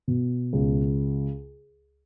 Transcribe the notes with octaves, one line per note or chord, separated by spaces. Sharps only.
B2
C#2